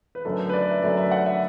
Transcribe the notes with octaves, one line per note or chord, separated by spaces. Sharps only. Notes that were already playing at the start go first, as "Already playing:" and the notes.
B4
F#2 D3 F#3 A3 A4
B4
D5
E5
F#2 D3 F#3 A3 D5
E5
F#5
E5